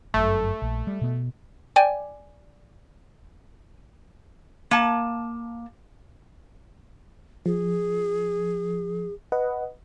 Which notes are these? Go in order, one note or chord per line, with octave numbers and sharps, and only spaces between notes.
G1 F#2 A3
A#1
G3
B2 B3
D5 G5 G#5
A#3 A5
F3 G#4
B4 D#5 F#5